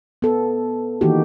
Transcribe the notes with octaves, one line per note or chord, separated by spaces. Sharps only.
B3 A4
D#3 E3 A#3 D#4 F#4 G4